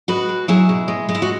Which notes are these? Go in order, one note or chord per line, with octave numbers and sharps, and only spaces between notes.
G#3 F#4 B4
G#3
F#3 E4 G#4
B2
G#3
G#3
E4
F#4